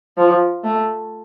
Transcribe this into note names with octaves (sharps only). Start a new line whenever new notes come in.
F3
A3